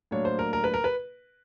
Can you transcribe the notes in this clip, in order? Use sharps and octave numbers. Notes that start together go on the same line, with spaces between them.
A2 F#3 A#3 D4 C#5
C5
A#4
A#4
B4
A#4
B4